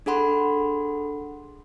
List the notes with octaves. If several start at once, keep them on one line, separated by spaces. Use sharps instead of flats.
D4 G#4 A4 F#5 B5 C6